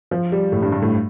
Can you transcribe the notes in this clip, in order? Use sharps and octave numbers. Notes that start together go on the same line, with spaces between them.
F3
G3
A2
G2
G2
A2